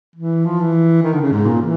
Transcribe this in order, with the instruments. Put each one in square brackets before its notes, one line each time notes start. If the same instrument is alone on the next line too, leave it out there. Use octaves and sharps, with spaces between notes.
[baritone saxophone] E3
F3
E3
D#3
D3
C#3
G#2
A#2
E3